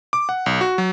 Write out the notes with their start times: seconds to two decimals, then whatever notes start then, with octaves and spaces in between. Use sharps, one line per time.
0.13 D6
0.29 F#5
0.46 B1
0.61 F#4
0.78 F#3